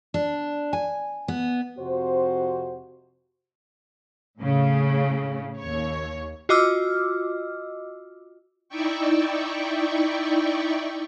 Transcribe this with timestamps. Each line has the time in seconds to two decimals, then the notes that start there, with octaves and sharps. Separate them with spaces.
0.14 D4
0.73 G#5
1.28 B3
1.78 F2 C3 F#4 C5
4.39 A2 C#3
5.58 D#2 C#5
6.49 F4 F#4 D#5 D6 E6 F6
8.69 D#4 E4 D5 E5 G5 C#6